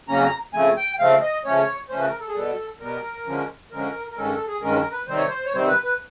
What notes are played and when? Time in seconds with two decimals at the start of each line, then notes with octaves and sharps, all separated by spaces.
0.08 F2 C#3 F#3 A#3 C#4 A#5
0.24 A#5
0.54 C#3 F3 A3 C4 G#5
0.77 G5
0.99 C#3 F3 A3 C4 F5
1.21 D#5
1.45 C#3 F3 A3 C#4 C#5
1.89 C#3 F3 A3 C#4 C5
1.99 B4
2.05 A#4
2.20 A4
2.28 G#4
2.35 B2 G3 B3 A4
2.80 B2 G3 B3 A#4
3.26 D3 F3 G#3 C#4
3.71 D3 F3 G#3 C#4 A#4
4.11 A#4
4.17 G2 D#3 G#3 C#4 A4
4.32 A4
4.47 G#4
4.62 G2 D#3 G#3 C#4 A#4
4.78 A#4
4.92 B4
5.07 C3 D#3 G3 C4 C5
5.17 C#5
5.26 C5
5.45 C#5
5.53 C3 D#3 G3 C4 C5
5.68 B4
5.83 B4